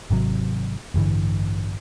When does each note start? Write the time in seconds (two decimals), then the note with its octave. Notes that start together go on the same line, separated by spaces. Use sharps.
0.11 G#1 C3 F#3
0.94 A1 G2 D3 E3